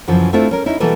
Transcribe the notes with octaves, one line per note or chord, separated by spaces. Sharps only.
F#2 C#3 E3 F3
A3 C4 D4 E4 F4
C#4 A#4
C#4 D#4 E4
B2 E3 G3 A#3 A4 B4